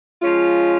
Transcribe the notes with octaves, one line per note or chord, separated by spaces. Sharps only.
F3 G#3 C#4 F4